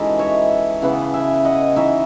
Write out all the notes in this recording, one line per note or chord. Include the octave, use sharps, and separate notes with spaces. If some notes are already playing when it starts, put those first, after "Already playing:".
Already playing: E3 G#3 C#4 D#4 F#4 A4 B4
C#5 E5
C#3 E3 B3 F#5 A5
E5 G#5
D#5 F#5
E3 B3 D#4 C#5 E5